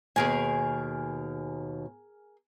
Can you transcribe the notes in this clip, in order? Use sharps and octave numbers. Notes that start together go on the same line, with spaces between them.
D#2 B2 G#4 A#4 G#5